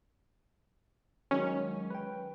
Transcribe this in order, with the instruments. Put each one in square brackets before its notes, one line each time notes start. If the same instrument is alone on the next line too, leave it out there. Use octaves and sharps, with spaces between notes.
[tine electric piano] D#3 F#3 G#3 [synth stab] C#4
[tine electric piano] B4 G5